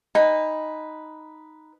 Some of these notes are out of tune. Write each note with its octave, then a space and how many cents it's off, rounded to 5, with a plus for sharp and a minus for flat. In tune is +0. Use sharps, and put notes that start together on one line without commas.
D#4 +0 B4 +0 G#5 -35